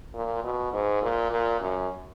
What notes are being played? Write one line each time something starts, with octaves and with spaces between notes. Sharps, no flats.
A#2
B2
G#2
A#2
A#2
F#2